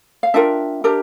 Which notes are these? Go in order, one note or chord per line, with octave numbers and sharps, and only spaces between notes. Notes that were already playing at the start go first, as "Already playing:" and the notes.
F5
D4 F4 A#4 E5 G5
D4 G4 A#4